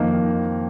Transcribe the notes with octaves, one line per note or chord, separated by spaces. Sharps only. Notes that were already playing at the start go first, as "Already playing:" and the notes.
Already playing: F2 D#3 A#3 D#4